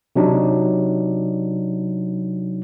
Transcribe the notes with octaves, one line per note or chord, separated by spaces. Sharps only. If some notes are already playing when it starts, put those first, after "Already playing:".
C3 F#3 D4 D#4